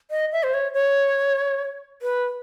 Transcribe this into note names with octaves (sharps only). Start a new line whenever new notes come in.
D#5
E5
C5
C#5
C#5
B4